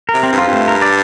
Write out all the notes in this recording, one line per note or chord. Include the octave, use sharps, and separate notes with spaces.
A#4
C3
C4
G2
F2 F4
G2
A3
A#4
D5